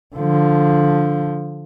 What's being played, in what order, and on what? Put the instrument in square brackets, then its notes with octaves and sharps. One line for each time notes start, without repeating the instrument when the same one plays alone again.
[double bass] D3 F3